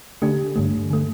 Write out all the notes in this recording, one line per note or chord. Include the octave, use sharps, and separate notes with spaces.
D3 A3 D4 G4
G2 D3 A3
D3 A3